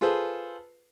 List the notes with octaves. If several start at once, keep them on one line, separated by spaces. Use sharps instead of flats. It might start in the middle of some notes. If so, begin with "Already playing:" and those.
F4 G#4 A4 B4 C5